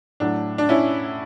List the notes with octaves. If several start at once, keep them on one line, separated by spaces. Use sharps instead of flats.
A2 F#3 A3 D4
D4
C#4 E4